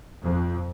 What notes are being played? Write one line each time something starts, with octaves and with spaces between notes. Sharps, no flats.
F2